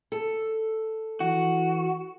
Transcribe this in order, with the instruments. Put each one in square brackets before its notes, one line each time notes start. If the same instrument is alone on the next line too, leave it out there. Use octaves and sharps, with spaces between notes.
[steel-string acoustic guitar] A4
[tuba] E3 [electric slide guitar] F#4